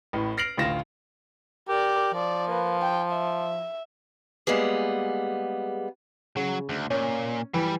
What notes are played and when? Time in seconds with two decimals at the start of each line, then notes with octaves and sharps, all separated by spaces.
0.13 A1 A2
0.37 F6 A#6 C7 D7 F7 F#7
0.57 A1 D2 F4 A#6 E7
1.68 G4 A#4 D5
2.13 F3 D5
2.47 A#3 B4
2.82 G5
3.12 E5
4.47 G3 G#3 A#3 B3 G#4
6.37 C#3 F#3
6.69 D2
6.90 A#2 C#4
7.54 E3 G3